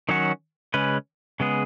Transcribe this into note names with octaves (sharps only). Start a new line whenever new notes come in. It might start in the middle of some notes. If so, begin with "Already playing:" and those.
D#3 F#3 C#4 F#4
C#3 G#3 C#4 B4
C#3 G#3 B3 G#4